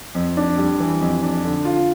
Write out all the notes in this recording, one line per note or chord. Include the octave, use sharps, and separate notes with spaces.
F2
D4
G3
E3
F2
D4
D3
F4